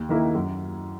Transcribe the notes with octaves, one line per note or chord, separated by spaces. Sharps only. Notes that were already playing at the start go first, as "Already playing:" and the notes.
Already playing: D#2
D#3 A#3 E4
F#2